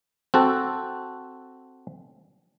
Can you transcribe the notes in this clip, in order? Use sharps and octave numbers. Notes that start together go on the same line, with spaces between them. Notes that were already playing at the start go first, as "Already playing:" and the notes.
C4 F#4 A4